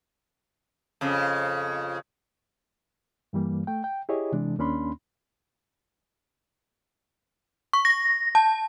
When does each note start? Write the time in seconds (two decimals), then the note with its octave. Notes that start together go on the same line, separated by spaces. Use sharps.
1.01 F2 C#3
3.33 G2 E3 G3 A#3
3.67 A3 G5
3.84 G5
4.09 E4 G4 G#4 C#5 D#5
4.32 C3 E3 G#3 D4
4.58 D#2 A#3 C#4 D4 B5 C6
7.73 C#6
7.85 A#6
8.35 A5